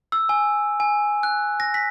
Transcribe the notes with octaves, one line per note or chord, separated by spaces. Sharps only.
E6
G#5
G#5
F#6
A#6
B6